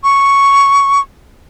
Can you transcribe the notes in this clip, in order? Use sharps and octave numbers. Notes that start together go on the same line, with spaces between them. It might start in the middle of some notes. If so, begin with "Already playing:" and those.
C#6